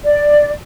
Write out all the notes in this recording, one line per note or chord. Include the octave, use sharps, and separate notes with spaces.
D5